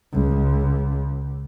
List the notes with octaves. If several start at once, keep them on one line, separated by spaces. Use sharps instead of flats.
C#2